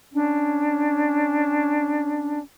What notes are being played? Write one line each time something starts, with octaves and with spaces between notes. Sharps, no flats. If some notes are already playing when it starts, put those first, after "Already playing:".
C#4 D4